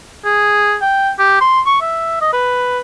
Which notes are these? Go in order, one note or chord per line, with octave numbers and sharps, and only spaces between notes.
G#4
G5
G4
C6
C#6
E5
D#5
B4